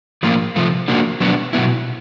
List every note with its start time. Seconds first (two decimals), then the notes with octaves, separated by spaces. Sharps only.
0.23 A2 F3 A#3 D4 F4
0.56 C3 F3 A3
0.88 F3 A#3 D4 F#4
1.21 B2 F#3 B3 D4 F#4
1.53 B2 F#3 B3 E4